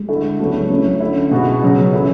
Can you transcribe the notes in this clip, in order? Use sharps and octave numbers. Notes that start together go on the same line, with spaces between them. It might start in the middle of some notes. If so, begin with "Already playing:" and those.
Already playing: G#3
D3 A3 E4
C#3 F#3 A3 B3 D4 F#4
F#3 A3 C#4 E4
D3 A3 E4
B2 G#3 B3 F#4
C#3 F#3 B3 C#4
E3 A3 E4